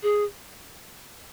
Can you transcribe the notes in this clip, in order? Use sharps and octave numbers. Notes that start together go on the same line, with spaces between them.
G#4